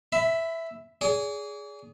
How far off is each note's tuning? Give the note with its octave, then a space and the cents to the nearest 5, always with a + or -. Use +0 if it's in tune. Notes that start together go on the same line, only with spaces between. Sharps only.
E5 +0 B5 +30
G#4 +0 D5 -45